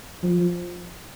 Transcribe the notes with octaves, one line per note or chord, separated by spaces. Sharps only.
F3